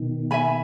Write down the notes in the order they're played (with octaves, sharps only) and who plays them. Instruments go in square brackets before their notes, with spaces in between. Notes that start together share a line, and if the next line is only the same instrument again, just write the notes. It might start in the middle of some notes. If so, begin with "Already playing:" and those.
Already playing: [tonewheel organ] B2 D#3
[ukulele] E5 G#5 B5